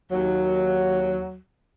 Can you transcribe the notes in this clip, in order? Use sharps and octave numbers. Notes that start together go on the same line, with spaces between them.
D#2 F#3